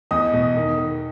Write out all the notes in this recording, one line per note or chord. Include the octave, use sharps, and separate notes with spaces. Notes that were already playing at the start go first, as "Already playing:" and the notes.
E2 D#5 D#6
B2
D#3
D#3